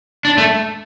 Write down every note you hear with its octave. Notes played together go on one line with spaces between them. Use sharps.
D4
A3